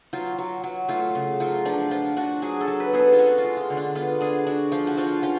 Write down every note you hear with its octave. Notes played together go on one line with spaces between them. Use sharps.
F#3 F4
F#3
F#3
A3 F4
C#3
F#3 F4
F3 D4
F3 F4
D4 F#4
F#3 G#4
A4
F#3
B4
B3 G#4
A4
F4
C#4 F#4
F4
G#3
F4
D3
D4
B3 F4
D4 G#4
D4 F#4
F3 F4
F#4
F3 F4
C#4 F4